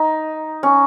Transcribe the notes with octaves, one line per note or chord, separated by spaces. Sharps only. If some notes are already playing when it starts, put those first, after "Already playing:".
Already playing: D#4
C#4